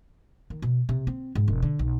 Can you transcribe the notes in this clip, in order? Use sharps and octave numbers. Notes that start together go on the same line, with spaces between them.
D#3
B2
C3
C4
G#2
E1
D3
B1